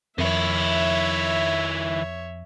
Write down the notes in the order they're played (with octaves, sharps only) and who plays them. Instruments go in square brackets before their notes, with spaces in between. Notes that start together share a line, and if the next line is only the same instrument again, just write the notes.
[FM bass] F2 [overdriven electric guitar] D#3 E4 [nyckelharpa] C#5 E5